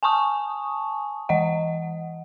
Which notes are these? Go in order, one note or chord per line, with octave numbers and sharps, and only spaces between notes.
G#5 A5 C#6 D#6
E3 D#5 F#5